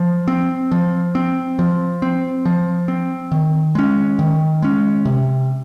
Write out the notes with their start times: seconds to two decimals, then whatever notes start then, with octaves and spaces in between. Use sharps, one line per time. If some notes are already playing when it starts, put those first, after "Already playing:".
Already playing: F3
0.28 C4
0.72 F3
1.15 C4
1.59 F3
2.02 C4
2.45 F3
2.88 C4
3.32 D#3
3.75 G#3 C#4
4.19 D#3
4.62 G#3 C#4
5.05 C3